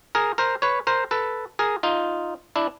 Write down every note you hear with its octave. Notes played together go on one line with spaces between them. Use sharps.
G#4 A#4
A#4 C5
B4 C#5
A#4 C5
A4 B4
G#4 A#4
D#4 F4
D4 E4